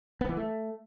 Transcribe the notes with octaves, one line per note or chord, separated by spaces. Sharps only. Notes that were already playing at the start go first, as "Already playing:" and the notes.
B3
E3
A3